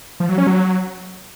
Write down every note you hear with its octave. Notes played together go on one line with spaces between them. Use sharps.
F3
F#3
C#4
F#3